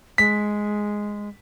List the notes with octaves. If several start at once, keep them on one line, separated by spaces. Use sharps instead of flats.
G#3 B6